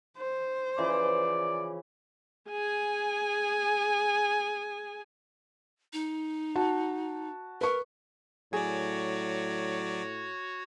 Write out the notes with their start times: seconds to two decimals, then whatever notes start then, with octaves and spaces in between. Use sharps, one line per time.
0.18 C5
0.78 C#3 E3 F3 D5
2.50 G#4 G#5
5.93 D#4
6.55 F#4 A5
7.61 A#4 B4 C#6
8.53 A2 F#3 F#4 G#4 C#5 D5